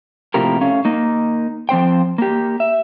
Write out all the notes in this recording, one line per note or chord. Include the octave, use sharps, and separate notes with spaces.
A2 C3 F3 A#3 G4 A#4
A3 C#4 F5
A#3 D#4
F3 C4 C5 G5
A#3 G4
E5